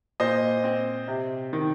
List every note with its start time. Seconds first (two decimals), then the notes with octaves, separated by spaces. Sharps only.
0.20 A#2 C5 D#5
0.64 C4
1.08 C3
1.53 D#3